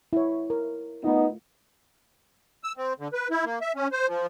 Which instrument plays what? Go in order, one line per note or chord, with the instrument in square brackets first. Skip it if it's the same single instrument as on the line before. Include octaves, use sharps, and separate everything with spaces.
[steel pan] E4 C#5
A#4
[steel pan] A3 F4 [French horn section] B3 D#4
[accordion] E6
C4
D3
B4
E4
A#3
E5
C#4
C5
F3